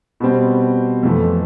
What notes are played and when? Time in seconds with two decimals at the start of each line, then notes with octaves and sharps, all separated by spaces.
0.20 B2 G3 C4
1.03 F2 E3 A3